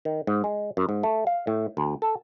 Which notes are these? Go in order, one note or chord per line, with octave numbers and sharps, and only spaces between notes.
D#3
G#2
G#3
F#2
G#2
A3
F5
A2
D2
A4